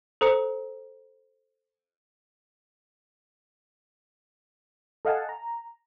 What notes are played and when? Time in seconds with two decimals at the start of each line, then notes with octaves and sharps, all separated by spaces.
0.21 A4 C5 A#5 D#6 C#7
5.05 A4 D#5 F5 F#5 G#5 A5
5.29 A#5